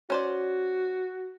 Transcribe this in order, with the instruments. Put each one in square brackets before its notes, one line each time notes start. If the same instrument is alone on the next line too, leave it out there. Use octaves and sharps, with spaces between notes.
[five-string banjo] C#4 C5 D5 [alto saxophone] F#4